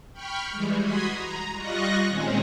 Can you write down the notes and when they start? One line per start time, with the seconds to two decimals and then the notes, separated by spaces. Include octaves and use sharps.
0.13 G5 B5 C#6 F6
0.51 E3 G3 G#3
0.81 F#4 B5 C6 D#6 G#6
1.11 A#5
1.54 G3 F4 D#5 C#6 F#6 A#6
2.09 A#2 D#3 G#3 C4 C#4 G#4